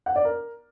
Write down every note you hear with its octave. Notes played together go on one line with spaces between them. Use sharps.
F#5
D5
A#4